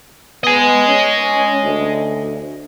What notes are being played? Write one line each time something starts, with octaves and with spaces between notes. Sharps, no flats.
B3 D#5 G#5
C#4
D2